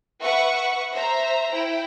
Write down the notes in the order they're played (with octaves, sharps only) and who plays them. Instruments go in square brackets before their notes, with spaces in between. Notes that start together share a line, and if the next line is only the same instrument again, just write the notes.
[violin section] B4 E5 F#5 C#6
C5 E5 A#5
E4 G5